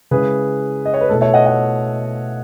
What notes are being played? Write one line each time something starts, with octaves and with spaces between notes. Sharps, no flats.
C#3 G#3 C#4 E4 G#4 B4
D#5
C#5
B4
B2 A3 E4 A4
C#5 E5
D#5 F#5
D#5 F#5